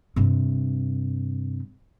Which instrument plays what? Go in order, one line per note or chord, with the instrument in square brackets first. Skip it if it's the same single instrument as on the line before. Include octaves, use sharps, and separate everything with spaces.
[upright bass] G2 C3